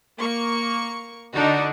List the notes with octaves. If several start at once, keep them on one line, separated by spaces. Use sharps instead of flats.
A#3 C#6
D3 D4 D#4 F#4